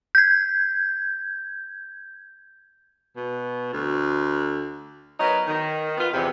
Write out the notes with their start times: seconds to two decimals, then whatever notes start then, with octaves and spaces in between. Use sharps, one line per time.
0.15 G6 G#6
3.16 B2
3.73 D2
5.19 F#3 B3 D#4 A#4
5.46 D#3
5.98 B3 F4
6.12 E2 C3